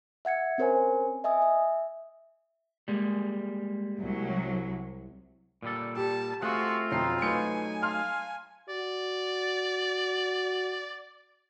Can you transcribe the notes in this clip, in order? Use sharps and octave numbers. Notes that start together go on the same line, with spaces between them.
E5 F#5 G#6 C#7
C4 C#4 A#4 C5 C#5 G#5
D#5 E5 G#5 D#6
E5
G3 G#3 A#3
C2 F#3
A#2 G3 A4
G4 A5
A3 C4 F4 F#4 G#4 F#5
E1 F2 D#4 C7
F#3 A3 D#4 B4 G#5 C#7
F5 A5 C6 F6
F#4 D5